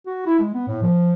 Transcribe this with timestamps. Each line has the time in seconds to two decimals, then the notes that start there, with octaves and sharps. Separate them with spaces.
0.07 F#4
0.27 E4
0.40 G#3
0.54 B3
0.68 A2
0.83 F3